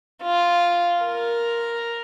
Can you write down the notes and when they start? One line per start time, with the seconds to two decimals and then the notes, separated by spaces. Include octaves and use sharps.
0.23 F4
1.03 A#4